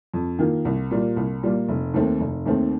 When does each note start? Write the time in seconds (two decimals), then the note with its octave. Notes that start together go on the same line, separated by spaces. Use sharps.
0.14 F2
0.39 D#3 A#3 F4
0.65 C2
0.91 A#2 G3 A#3 F4
1.16 C2
1.43 A#2 G3 A#3 F4
1.69 F1
1.94 D#2 D#3 A3 C4
2.21 F1
2.46 D#2 D#3 A3 C4